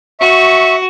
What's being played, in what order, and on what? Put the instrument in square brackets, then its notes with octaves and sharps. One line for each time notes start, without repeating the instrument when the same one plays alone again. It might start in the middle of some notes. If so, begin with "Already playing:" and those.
[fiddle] F#4 [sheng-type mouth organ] E5 C#6